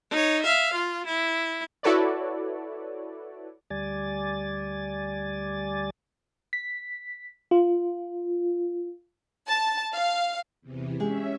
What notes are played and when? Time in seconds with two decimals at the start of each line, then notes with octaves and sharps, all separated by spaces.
0.11 D#4 C#5
0.42 E5 F5
0.74 F4
1.07 E4
1.83 E4 F#4 A4 B4 C#5 D5
3.70 D2 G3 D5 G#5 A6
6.53 B6
7.51 F4
9.48 A5
9.93 F5
10.61 E2 C3 E3
11.00 G#3 C#4 G4 G#4 E5